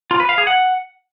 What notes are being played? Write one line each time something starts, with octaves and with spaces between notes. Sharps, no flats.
F4
B4
F5
G#4
F#5